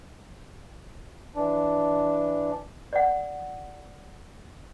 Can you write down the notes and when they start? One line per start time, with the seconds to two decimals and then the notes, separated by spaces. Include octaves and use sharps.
1.36 E3 D4
2.93 D5 F#5